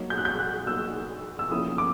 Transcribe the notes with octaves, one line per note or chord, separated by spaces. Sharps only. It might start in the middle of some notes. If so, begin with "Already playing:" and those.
Already playing: F#3 A#3 D#4
G6
F#6
G6
F#6
F#3 A#3 D#4 E6
E6
F3 A#3 C#4 E4 D#6
D6